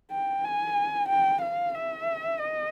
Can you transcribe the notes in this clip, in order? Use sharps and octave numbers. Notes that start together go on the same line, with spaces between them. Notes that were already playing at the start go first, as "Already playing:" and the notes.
G5
G#5
G5
F5
E5
D#5